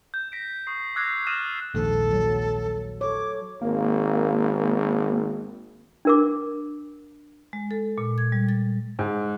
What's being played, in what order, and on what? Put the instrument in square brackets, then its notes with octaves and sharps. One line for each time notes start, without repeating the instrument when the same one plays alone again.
[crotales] G6
A#6 B6 D7
C#6 D#6 C7
D6 E6 F#6 G#6 A#6 C7
D#6 F6 A6 A#6 D#7 E7
[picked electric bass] A#1 D#2 G#2 [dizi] A4
[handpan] F#3
[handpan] A4 C#5 [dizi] D6
[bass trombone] G#1 [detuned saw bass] A#3
[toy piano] D4 A#4 D6
[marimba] G#3
A4
A#2
G#6
G3
A6
[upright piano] G#2